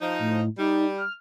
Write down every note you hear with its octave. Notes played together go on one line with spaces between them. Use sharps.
F3 D#4
A2
G3 D#4
F6